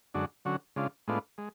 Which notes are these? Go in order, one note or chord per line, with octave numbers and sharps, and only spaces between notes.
F#2 D3 G#3 D4 F#4
D3 F#3 C#4 F#4
C#3 G#3 D4 F4
A2 G#3 B3 D4 F4
G#3